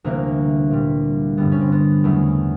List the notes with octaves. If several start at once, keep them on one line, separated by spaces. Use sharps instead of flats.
D2 C3 E3 G3 A#3
A#2 G3
G2 D3 G3 B3
C#4
C4
B3
E2 C#3 F#3 A3